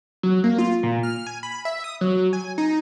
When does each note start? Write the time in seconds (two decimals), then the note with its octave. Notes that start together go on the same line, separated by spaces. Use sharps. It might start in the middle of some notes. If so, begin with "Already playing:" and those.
0.23 F#3
0.44 A#3
0.58 F4
0.83 A#2
1.03 F6
1.27 G#5
1.43 B5
1.65 E5
1.84 D#6
2.01 F#3
2.33 G#5
2.58 D#4